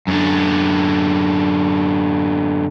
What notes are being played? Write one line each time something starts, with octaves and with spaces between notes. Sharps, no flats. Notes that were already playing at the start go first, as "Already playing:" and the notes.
F#2 D3